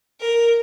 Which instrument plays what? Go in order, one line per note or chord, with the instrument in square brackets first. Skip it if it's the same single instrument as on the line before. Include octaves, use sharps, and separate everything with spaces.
[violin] A#4